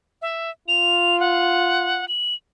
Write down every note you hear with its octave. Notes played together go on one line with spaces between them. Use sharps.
E5
F4 F7
F#5
F#7